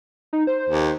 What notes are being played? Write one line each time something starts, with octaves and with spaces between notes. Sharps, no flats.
D#4
C5
D#2